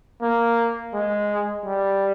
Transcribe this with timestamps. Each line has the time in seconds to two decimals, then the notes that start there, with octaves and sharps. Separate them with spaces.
0.21 A#3
0.93 G#3
1.65 G3